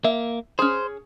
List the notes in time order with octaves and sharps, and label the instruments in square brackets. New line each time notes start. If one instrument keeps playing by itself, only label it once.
[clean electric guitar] A#3 [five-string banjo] E5
[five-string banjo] C#4 G#4 [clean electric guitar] C5